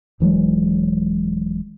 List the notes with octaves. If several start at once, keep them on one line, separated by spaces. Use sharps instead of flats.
D#1 E3 F#3 G#3